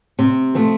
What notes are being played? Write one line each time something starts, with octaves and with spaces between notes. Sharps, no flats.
C3
F3 A3 C4